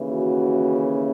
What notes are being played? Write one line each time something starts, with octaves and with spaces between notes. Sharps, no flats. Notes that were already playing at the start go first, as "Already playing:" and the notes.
Already playing: D#2 C#3 E3
F#4